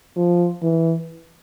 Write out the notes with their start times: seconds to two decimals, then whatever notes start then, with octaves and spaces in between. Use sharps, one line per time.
0.16 F3
0.63 E3